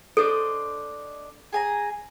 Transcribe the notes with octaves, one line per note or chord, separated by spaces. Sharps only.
D4 A4 C5 D#5
G#4 G#5 A#5